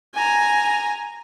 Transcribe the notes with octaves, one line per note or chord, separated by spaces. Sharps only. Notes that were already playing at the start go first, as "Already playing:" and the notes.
G#5 A#5